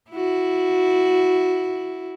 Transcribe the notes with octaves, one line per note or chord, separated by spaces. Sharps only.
E4 F#4